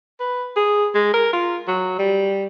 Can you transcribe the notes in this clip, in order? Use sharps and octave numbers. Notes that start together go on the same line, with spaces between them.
B4
G#4
G#3
A#4
F4
F#3
G3